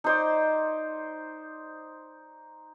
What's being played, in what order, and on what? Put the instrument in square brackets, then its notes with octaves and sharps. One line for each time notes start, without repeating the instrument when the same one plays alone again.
[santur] D#4 C5 D5